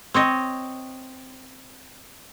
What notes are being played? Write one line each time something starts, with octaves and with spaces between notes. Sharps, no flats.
C4 C#5 D#5